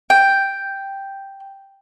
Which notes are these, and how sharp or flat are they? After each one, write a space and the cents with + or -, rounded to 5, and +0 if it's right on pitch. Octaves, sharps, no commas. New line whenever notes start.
G5 +0